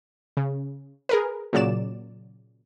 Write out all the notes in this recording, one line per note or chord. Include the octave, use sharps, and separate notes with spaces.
C#3
G#4 A#4 B4
A#2 C#3 F#3 D5 E7